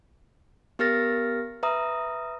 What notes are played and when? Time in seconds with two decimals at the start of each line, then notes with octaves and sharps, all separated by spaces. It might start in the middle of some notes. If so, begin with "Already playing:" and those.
0.79 B3 G4 A#4 F6 A6 A#6
1.63 B4 E5 A#5 D#6